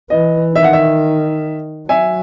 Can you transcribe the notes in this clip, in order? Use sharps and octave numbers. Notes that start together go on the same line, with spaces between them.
E3 D#5
D#3 E5
F#5
E5
F#3 E5 G#5